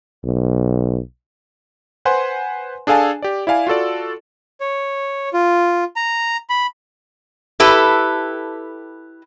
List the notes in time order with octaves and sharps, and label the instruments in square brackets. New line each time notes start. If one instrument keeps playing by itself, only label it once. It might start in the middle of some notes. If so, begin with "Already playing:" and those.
[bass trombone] B1
[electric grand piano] B4 C5 F#5 G#5 C6
D4 G#4 A4 F5 G#5 A5
G4 D5
E4 D5 F5 G#5
F4 F#4 A4 D5
[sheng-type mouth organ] C#5
F4
A#5
B5
[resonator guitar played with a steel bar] E4 G4 A4 B4